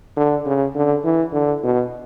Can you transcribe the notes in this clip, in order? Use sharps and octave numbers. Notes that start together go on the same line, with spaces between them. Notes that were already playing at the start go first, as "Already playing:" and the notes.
D3
C#3
D3
E3
D3
B2